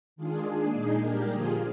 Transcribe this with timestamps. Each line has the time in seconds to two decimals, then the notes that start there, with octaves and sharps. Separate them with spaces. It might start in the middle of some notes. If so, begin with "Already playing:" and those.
0.16 D#3 G#3 D4 F4 G#4
0.45 A#3 D4 G#4
0.73 A#2 G#3 D#4 G#4
1.01 A#2 G3 D4 G4 A#4
1.29 D3 F3 A#3 F4 G#4